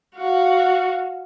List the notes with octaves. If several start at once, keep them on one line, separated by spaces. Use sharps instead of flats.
F#4 F5